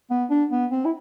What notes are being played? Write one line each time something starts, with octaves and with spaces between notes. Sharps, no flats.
B3
D4
B3
C4
E4